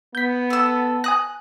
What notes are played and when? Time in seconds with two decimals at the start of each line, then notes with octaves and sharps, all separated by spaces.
0.15 B3 G6 B6
0.50 A4 E6
1.04 G#5 D#6 F#6 A#6